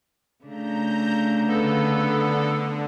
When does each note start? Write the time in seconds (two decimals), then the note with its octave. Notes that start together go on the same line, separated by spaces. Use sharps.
0.45 C#3 A3 D4 A#5 G6
1.49 D3 B3 A4